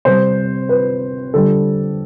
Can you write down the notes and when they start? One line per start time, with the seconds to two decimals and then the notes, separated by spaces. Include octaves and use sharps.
0.05 C3 G3 C5
0.69 B4
1.34 D3 G3 A4